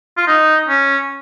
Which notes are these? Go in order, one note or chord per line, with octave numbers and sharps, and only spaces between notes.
F4
D#4
C#4